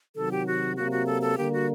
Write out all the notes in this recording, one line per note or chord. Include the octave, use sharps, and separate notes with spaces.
C3 D#3 F#3 A4
G4
F#4
C3 F#3 A#3 F#4
F#4
A4
A4
D3 G3 A#3 G4
F#4